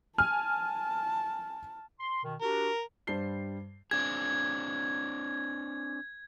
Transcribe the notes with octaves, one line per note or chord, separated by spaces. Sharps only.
G#5 A5 F6
C6
B2 D#3
D4 F#4 G4 A#4
G2 G3 C5 A5 C7 G7
C4 D4 G#4 G#6